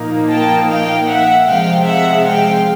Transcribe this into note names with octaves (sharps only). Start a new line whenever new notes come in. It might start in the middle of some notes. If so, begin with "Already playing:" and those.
Already playing: A#2 F3 A#3 D#4
G5 A5
F5 G5
E5 F#5
C3 F3 G#3 F5 G5
E5 F#5
F5 G5